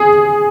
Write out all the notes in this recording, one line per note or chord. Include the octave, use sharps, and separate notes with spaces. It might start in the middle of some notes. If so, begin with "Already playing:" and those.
Already playing: G#4